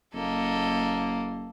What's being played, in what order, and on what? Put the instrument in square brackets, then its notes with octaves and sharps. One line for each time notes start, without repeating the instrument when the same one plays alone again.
[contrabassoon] F#1 [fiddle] A#3 [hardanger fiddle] A4 D#5